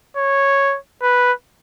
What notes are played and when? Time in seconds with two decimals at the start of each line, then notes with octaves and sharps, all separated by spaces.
0.17 C#5
1.02 B4